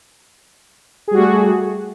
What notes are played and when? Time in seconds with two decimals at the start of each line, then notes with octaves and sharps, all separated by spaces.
1.08 G#4
1.11 G3
1.15 F#4
1.18 A3